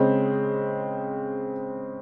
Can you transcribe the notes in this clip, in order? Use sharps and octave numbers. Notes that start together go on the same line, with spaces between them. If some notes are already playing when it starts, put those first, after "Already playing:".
Already playing: C#3 G#3 C4